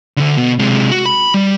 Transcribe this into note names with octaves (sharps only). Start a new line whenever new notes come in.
D2 D3
B2
C3 G#3
F#4
B5
G3